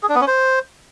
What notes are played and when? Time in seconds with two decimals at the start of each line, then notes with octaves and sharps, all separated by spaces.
0.03 G#4
0.09 D4
0.15 B3
0.21 C#4
0.27 C5